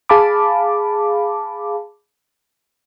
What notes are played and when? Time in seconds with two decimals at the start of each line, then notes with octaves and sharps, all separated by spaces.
0.09 G#4 F5 A5 B5 D6